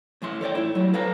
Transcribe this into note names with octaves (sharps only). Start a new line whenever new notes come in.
A2 E3 E5 C6
A4 C#5 D5 G5
A2 E4
F#3 G3
A4 B4 F5 G5 A#5